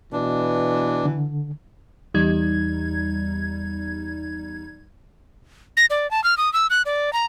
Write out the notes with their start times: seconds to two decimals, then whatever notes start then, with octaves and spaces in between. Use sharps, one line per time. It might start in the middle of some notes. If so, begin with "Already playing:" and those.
0.12 B2 E3 D4
1.05 D3
2.14 E2 G3 D#4 G#6
5.77 A#6
5.90 D5
6.11 A5
6.24 F6
6.38 D#6
6.53 E6
6.70 F#6
6.86 D5
7.13 A#5